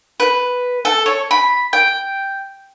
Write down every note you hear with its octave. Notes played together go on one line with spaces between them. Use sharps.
B4
A4
C#5
B5
G5